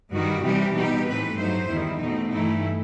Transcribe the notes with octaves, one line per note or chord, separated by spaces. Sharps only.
G2 D#3 G3 F#4
C3 E3 G3 B3 G4
B2 G3 D#4 G4
A2 E3 A3 C4 B4
G2 F#3 A3 D#4 C5
E2 D#3 G3 E4
B2 A3 C4 D#4
G2 E3 A3 D#4 E4